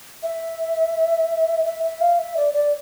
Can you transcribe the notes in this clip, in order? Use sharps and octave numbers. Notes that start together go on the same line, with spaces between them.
E5
E5
E5
F5
E5
D5
D5